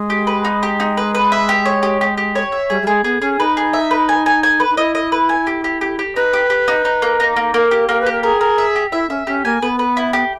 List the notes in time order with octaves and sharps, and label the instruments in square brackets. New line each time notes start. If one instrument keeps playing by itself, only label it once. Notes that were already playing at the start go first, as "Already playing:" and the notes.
Already playing: [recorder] G#3
[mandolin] G4
B4
D#4
G4
D#4
B4
B4
E5
G4
C#5
G4
G4
G4
C#5
E5
[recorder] G3 [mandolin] G#4
[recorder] G3
[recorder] G#3 [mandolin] G#4
[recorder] B3 [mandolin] G#4
[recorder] C#4 [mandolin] G#4
[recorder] D#4 [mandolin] B4
[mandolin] G#4
E5
B4
G#5
G#5
G#5
B4
[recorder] D#4
[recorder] E4 [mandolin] D#5
[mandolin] D#5
B4
G#5
G4
G4
G4
G4
[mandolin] D#4 [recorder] B4
[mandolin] G4
G4
D#4
D#4
A#3
D#4
A#3
[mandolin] A#3 [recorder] A#4
[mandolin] G4
[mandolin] A#3 [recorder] A#4
[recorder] B4
[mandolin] G4
[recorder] A#4
[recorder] G#4 [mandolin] A#4
[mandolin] A#4
E5
G4
[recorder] E4 [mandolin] E5
[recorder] C#4 [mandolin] E5
[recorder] C#4 [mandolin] G4
[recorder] A#3 [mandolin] G#5
[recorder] B3 [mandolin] B4
[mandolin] B4
E4
G4